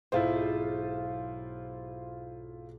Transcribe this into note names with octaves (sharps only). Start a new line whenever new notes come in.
B1 G#2 E4 F4 C5